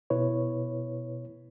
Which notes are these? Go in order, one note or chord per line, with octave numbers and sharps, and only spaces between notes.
B2 E4 B4 C#5